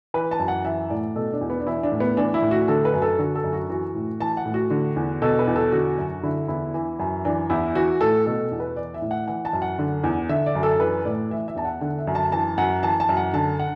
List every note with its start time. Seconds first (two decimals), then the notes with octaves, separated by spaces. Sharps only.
0.14 E3 B4
0.31 A5
0.39 F#2
0.48 F#5
0.65 E3 E5
0.90 A2 D5
1.16 B2 A4
1.33 D4
1.41 E2
1.50 B3
1.60 D4
1.67 E3 E4
1.83 D4
1.92 A2
2.00 B3
2.17 E3 D4
2.34 E4
2.42 A2
2.51 F#4
2.68 D3 A4
2.85 B4
2.93 F#2
3.02 A4
3.19 D3 F#4
3.35 A4
3.44 F#2
3.53 F#4
3.69 E3 F#4
3.95 A2
4.20 E3 A5
4.37 F#5
4.46 A2
4.54 F#4
4.70 D3
4.96 E2
5.22 B2 A4
5.39 B4
5.47 E2
5.56 A4
5.72 D3 F#4
5.98 F#2
6.23 D3 E4
6.48 E2 E4
6.74 E3
6.99 F#2
7.25 E3 D4
7.50 E2 E4
7.75 E3 F#4
8.01 A2 A4
8.26 B2 A4
8.52 E2
8.60 B4
8.77 E3 D5
8.94 E5
9.02 A2
9.11 F#5
9.28 E3 F#5
9.45 A5
9.53 F#2
9.62 F#5
9.79 D3
10.04 E2
10.29 D3 E5
10.46 D5
10.55 F#2
10.63 A4
10.80 E3 B4
11.05 A2 D5
11.31 E3 E5
11.48 E5
11.56 E2 A5
11.65 F#5
11.81 D3 F#5
11.99 E5
12.07 F#2
12.15 A5
12.32 E3 A5
12.58 F#2 F#5
12.83 E3 A5
13.00 A5
13.09 F#2
13.17 F#5
13.34 D3 A5
13.60 F#5